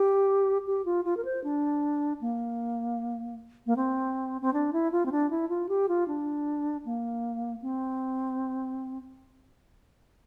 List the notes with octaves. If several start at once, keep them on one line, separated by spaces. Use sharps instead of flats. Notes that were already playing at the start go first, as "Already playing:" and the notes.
Already playing: G4
G4
F4
F4
A#4
C5
D4
A#3
A#3
C4
C4
D4
E4
F4
C4
D4
E4
F4
G4
F4
D4
A#3
C4